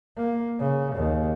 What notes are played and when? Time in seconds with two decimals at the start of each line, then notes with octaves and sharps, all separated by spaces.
0.17 A#3
0.59 C#3
0.95 D#2